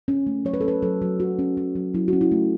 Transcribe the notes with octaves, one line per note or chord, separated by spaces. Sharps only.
C#4
A3
F#3 C#5
B4
A4
C#4 B4
F#3 A4
F#3
F#3 F#4
C#4
C#4
F#3
F#3 E4
C#4 F#4
E4
A3